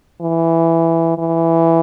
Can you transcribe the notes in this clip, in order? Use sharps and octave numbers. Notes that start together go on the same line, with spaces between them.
E3
E3